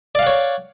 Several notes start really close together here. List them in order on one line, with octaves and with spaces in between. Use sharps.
D5 F5 F#5 C#5